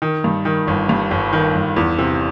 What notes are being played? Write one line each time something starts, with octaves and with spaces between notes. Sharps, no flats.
D#3
G2
D#3
G1
G2
G1
D#3
G1
E2
C3